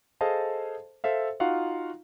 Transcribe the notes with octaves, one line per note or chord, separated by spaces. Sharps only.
G#4 A4 C5 D#5 F5 A5
A4 C5 E5 F5
D#4 F4 F#4 F5 F#5